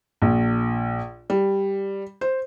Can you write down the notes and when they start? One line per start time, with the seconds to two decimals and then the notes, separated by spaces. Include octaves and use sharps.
0.22 A#1
1.30 G3
2.21 C5